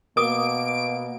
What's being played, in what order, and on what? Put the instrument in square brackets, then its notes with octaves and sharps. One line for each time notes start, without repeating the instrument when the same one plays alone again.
[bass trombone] B2 [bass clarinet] A#3 [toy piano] A#4 D6 D#6 [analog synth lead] D7